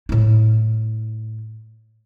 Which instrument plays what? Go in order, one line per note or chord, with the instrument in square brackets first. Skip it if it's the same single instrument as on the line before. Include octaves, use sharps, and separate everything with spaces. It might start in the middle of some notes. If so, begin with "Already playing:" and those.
[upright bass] A2 E4